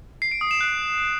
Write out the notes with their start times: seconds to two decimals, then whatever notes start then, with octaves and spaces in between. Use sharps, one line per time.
0.22 C7
0.31 D7
0.41 D#6
0.51 E7
0.61 F#6